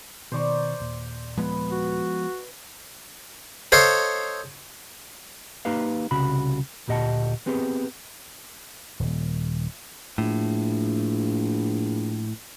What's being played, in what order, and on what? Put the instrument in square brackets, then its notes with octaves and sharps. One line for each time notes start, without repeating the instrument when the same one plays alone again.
[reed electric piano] B2 D#3 C#6 [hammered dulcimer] C5 D5 A#5
[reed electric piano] D#2 A#2
[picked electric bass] F3 G#3 B3 [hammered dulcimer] B4
[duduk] F#4
[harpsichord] A4 C5 C#5 D#5 F5
[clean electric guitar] A#3 D#4 G4 B4 F5
C2 C#3 F#4 B5
D2 A#2 G4 D#5 F#5 A5
B3 C4 G4 G#4 B4
[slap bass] D#1
[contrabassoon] A#1 [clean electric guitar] A2